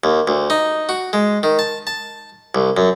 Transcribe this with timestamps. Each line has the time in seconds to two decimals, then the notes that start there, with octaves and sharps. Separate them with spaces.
0.04 D#2
0.27 D2
0.50 D#4
0.89 F#4
1.13 G#3
1.43 D#3
1.59 A5
1.87 A5
2.55 C2
2.77 F#2